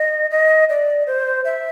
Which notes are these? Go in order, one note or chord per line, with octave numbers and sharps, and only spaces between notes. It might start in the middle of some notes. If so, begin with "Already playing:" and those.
Already playing: D#5
D#5
D5
C5
E5